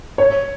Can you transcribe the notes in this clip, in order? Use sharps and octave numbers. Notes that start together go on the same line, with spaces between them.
C#5